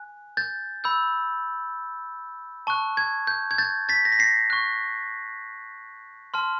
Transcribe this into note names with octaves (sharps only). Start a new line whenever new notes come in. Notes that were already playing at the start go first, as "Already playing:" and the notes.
Already playing: G#5 F#6
G6 A6
B5 E6 G6
A5 C#6 F#6
G#6
G6
G#6
G6 A6
A6 B6
A#6
B6
A#6 C7
C#6 F#6
A5 C6 F6